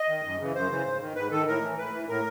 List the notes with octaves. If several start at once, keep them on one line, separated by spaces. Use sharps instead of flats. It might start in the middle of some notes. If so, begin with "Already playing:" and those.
Already playing: D#5
D#3
F#2
C#3 E3
F#2 C5
C#3 E3
G#2
D#3
G#2 B4
D#3 A4
A2 A#4
E3
A2 B4
E3
A2 A#4